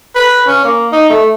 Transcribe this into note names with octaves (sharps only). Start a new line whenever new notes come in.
B4
C#4
A#3
D#4
A3